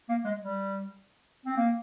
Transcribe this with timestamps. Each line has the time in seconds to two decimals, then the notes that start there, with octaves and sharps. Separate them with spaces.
0.09 A#3
0.25 G#3
0.41 G3
1.46 C4
1.57 A#3